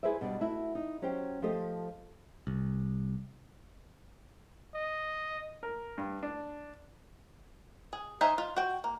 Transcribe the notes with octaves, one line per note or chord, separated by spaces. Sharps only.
E4 G#4 B4 C5 D5 E5
B2 G3 D4
A3 B3 E4 F#4
D#4
F#3 C#4 G4 C5 G5
F3 A3 G4 A4 C5 D#5
C2
D#5
A#4
G2
D4
G#4
D#4 C5 E5 G#5
F4
F#4 G5
A#3